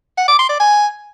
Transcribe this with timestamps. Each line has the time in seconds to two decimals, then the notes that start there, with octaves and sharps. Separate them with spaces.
0.18 F#5
0.28 D6
0.39 C6
0.49 D5
0.60 G#5